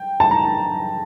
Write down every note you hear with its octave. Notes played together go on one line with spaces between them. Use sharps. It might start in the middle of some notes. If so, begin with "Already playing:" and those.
Already playing: G5
A5
A#5